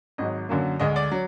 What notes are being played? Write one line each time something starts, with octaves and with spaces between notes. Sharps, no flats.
G#1 G#2 F#3 D#5
F#2 D3 F#3 A#3
D2 D3 G#3 D#5
D5
F#3